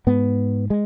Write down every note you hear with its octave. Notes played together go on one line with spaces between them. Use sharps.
G#2 B3
G#3